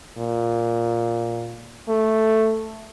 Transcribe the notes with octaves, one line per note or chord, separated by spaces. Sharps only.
A#2
A3